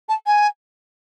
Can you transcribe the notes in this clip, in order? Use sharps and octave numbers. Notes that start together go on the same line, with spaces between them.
A5
G#5